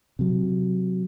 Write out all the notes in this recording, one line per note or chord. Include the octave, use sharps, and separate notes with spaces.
C3 F#3